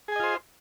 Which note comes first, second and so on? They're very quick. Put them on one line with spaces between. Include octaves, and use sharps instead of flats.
G#4 G#5 D#5 F4 C5